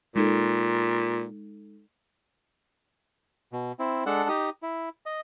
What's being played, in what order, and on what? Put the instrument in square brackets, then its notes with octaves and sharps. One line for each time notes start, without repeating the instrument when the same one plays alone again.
[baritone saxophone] A#2 [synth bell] G#3 D#4 A4
[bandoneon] B2
C4 E4
G#3 D4 A4 F#5
D#4 G4 D#6
E4
D#5